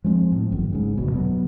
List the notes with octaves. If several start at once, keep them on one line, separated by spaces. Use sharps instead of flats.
F3 G#3 B3 C4
A2
G#1 F#2
G#2 C#3
F1 D2 B2
B2 F#3 G3 B3